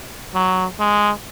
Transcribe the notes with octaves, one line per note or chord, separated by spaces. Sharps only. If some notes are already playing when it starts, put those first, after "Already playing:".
F#3
G#3